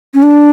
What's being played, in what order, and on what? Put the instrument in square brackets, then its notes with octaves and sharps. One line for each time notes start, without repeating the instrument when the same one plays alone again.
[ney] C#4
D4